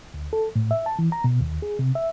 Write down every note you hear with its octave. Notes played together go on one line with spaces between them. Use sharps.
D2
A4
A2
E5
A5
E3
A#5
B2
D#2
G#4
C3
E5